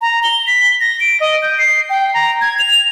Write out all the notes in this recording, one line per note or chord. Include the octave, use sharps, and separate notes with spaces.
A#5
G7
B6
A#6
D7
D#5
G6
C7
G5
A#5
G#6
F7